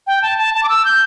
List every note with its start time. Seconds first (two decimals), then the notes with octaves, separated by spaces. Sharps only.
0.07 G5
0.22 A5
0.38 A5
0.54 A5
0.63 D6
0.69 E6
0.85 G6